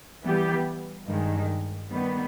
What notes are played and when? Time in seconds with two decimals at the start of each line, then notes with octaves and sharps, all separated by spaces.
0.22 E3 G3 B3 G4
1.06 G2 D#3 G#3
1.91 D#3 G3 B3